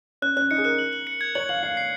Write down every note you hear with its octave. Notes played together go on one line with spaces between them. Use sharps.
C#4 F#6
C#4 F#6
D#4 C#7
G#4
A#4 F#6
F#7
F#7
C#7
G#6
C#5 F#7
F5 F#7
F5 C7
C7